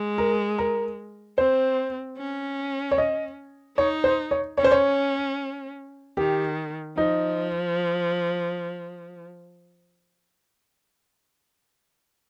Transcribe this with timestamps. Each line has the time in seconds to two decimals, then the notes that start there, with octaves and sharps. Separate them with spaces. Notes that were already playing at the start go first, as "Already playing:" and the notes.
Already playing: G#3
0.18 A#4
0.58 A#4
1.38 C4 C5
2.17 C#4
2.91 C#5
2.98 D#5
3.77 D#4 C#5
4.04 C5
4.31 C#5
4.58 C#4 C#5
4.64 C5
4.71 C#5
6.17 D#3 G4
6.97 F3 D#4